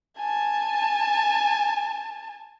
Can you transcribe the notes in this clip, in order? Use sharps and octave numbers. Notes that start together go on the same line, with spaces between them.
G#5 A5